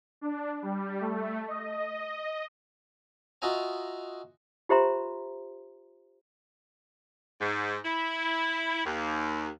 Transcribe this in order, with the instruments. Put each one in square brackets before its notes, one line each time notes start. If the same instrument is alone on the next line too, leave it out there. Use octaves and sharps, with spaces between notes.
[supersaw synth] D4
G3
A3
D#5
[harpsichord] F4 F#4 D#5 E5 G#5 A#5
[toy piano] F4 G4 C5 E5 A#5 C6
[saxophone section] G#2
E4
D#2